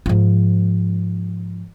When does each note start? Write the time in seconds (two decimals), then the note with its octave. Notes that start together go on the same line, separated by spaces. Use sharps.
0.06 G#2 F3